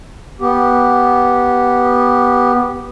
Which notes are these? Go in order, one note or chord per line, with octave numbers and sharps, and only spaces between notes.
B3 G4